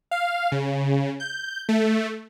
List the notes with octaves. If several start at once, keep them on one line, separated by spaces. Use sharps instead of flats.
F5
C#3
G6
A3